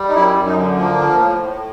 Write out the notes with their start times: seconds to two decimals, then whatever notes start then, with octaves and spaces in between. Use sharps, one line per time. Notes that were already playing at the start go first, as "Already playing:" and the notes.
Already playing: G3
0.09 D#4
0.14 F#2 E4
0.36 F#2
0.46 D#4
0.56 D3
0.77 F3 A#3
0.98 F3
1.19 A2
1.40 A2